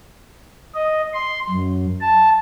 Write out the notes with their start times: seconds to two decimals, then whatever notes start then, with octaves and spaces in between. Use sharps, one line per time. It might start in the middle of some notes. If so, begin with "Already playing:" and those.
0.74 D#5
1.14 C6
1.49 F#2
2.00 A5